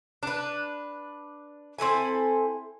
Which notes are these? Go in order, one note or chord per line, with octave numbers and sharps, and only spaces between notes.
D4 B4
C4 E4 A4 G#5